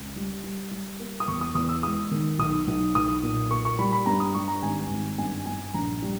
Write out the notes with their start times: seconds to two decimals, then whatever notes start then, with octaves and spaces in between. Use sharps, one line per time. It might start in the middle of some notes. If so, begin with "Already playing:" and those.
Already playing: C#2
0.16 G3
0.44 G3
0.71 G3
0.99 A#3
1.20 D#6
1.28 E2 C#6
1.41 D#6
1.55 E2 D#6
1.69 E6
1.83 G#3 D#6
2.11 D#3
2.38 B1 D#6
2.67 B1
2.95 B1 D#6
3.23 A#2
3.50 A#3 C#6
3.65 C#6
3.79 G3 B5
3.92 B5
4.06 G2 A#5
4.20 D#6
4.34 G3 C#6
4.48 A#5
4.62 G#1 G#5
4.90 G#1
5.18 G2 G#5
5.46 G2 G#5
5.74 A#1 A#5
6.02 G3